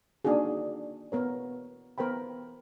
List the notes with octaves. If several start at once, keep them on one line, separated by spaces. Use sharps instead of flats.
A#3 D4 D#4 F#4 G#4
B3 A#4 C#5
B3 A#4 C5 G5 B5